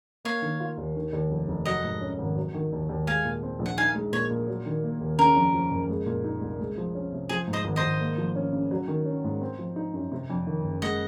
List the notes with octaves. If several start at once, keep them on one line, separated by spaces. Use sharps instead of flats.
A#3 C#5 F5
D#3
F4
D#2
D#3
D#2
F1
F1
F#3 D#5 F#5
G#2
C#4
G#1
F#3
D#3
D#2
D#2
G#3 F5 G#5
A#2
C4
A#1
F#5
D#4 F5 G#5
G#3
A#2 C#5
A#2
F#3
D#3
A#3
D#2
C#3 A#4
F2
F3
F#1
G#3
A#2
D#4
C2
G#3
F3
C#4
C3
F3 G#4
G#2
C5 D#5
G#1
C5 D#5
G#1
A#3
F3
C#4
C#3
F#3
D#3
C#4
G#2
C4
F3
D#4
F#2
C3
F2
D#3
F#1
G#3 D#5 F#5